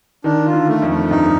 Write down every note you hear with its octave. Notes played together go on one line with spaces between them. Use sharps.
D#3 D4
F4
D3
A3
F2
A3
G2 D#4